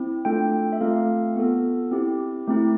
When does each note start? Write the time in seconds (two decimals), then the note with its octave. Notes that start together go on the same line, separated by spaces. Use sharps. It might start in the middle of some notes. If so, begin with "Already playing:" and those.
Already playing: C4 E4
0.25 A3 D4 F4 A4 G5
0.73 E5
0.81 A3 C4 F4 A4 F5
1.36 B3 F4 A4
1.91 C4 E4 G4
2.47 A3 C4 E4